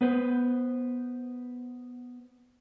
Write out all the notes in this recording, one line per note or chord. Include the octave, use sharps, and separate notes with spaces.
B3 B4 C5